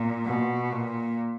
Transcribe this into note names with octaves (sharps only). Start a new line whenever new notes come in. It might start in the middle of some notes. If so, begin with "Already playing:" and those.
Already playing: A#2
B2
A#2